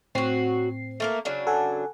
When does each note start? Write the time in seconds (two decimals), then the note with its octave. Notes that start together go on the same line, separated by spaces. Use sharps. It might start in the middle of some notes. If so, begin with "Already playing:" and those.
0.15 A2 F#3 C4 F#4 C7
1.00 A3 A#3 A#4
1.25 C#3 F#3 D4
1.47 A4 F#5 G#5